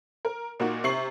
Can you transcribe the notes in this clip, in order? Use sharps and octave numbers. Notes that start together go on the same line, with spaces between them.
A#4
A#2 A#3 D#4 F#4
C3 C#6 C7 F#7